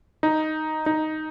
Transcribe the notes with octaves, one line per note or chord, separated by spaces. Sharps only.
D#4
D#4